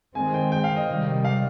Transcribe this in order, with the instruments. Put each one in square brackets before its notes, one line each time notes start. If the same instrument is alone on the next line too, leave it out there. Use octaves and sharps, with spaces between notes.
[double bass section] D#3 G#3 C4 [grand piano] G#5
[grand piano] G5
G5
F5
D#5
[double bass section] C3 D#3 G3
[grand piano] F5